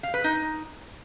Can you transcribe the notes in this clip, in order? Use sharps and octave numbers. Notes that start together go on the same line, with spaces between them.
F5
B4
D#4